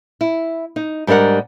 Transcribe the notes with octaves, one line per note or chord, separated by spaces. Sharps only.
E4
D#4
G#2 G3 D4 A#4 F#5